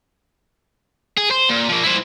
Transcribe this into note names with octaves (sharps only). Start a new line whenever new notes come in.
G#4
C5
A#2
F3 A#3
E4 C5